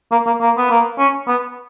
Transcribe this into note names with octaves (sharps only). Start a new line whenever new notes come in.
A#3
A#3
A#3
B3
A#3
C#4
B3